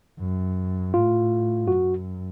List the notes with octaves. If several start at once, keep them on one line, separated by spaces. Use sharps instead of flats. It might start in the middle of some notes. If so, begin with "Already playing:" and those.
F#2
A2 F4
F#2 F#4